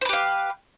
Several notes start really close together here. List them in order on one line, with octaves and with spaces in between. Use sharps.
C5 B4 G4 F5